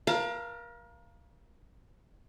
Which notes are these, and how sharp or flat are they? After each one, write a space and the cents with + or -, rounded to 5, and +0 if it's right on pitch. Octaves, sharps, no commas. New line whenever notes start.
A#4 +35 F5 -15 A#5 -45